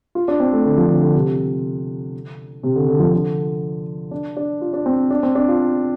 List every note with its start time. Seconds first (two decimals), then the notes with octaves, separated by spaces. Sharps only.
0.15 F4
0.28 D4
0.40 C4
0.53 A3
0.65 D3
0.78 F3
0.90 D3
1.02 D3
1.15 C3
1.39 D3
2.63 C3
2.75 D3
2.88 D3
3.00 F3
3.13 D3
4.11 D4
4.37 D4
4.61 F4
4.73 D4
4.86 C4
5.11 D4
5.23 C4
5.35 D4
5.48 F4